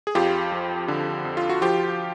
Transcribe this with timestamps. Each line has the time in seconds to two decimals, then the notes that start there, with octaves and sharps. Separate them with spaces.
0.07 G#4
0.15 F2 F4 G4
0.52 F3
0.88 D3
1.25 F2
1.37 F4
1.50 F#4
1.62 F3 F4 G4